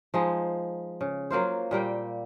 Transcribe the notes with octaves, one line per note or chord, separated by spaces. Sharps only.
F3 G#3 D#4
C#3
F#3 A#3 F4 C5
A#2 G3 A#3 G5